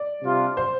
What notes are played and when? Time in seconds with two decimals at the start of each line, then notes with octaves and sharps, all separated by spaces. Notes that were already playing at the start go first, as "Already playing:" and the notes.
Already playing: D5
0.22 C3 G3 D4 F4
0.57 C5